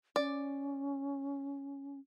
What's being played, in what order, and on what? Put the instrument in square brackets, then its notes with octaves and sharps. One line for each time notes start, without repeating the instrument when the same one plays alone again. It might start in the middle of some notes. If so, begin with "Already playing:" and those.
[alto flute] C#4 [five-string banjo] D5